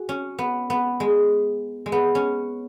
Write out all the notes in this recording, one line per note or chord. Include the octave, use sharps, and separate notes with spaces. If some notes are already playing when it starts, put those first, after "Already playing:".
Already playing: F#4 G#4
C#4
B3
B3
G#3
G#3
B3
C#4